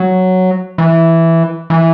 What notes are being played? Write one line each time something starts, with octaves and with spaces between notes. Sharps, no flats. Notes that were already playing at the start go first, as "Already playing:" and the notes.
Already playing: F#3
E3
E3